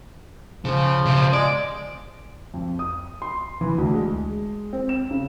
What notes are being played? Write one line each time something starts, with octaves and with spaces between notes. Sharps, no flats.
C#3 F3
C#3 C4
G#3 D5
F2
D#6
C6
E3
D2
G#3
C4
E7
C#3